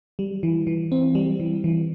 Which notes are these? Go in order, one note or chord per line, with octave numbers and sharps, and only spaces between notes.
G3
E3
E3
C4
G3
E3
E3